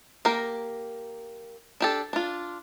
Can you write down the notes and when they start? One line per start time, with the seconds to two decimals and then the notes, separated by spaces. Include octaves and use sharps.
0.25 A#3 G4 A#4
1.81 D4 G4 A4
2.13 D4 F4